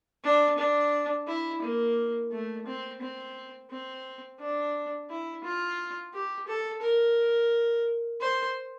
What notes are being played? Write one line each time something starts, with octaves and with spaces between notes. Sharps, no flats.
D4
D4
E4
A#3
A3
C4
C4
C4
D4
E4
F4
G4
A4
A#4
C5